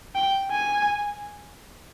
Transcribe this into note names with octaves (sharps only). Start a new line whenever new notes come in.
G5
G#5